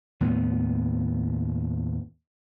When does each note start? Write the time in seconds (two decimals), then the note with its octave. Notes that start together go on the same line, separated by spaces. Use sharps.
0.21 D#2 A2 B3